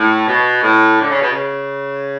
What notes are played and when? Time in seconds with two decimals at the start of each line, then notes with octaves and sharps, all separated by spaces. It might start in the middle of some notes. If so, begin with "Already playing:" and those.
Already playing: A2
0.28 B2
0.63 A2
1.01 D3
1.11 C#3
1.22 B2
1.32 C#3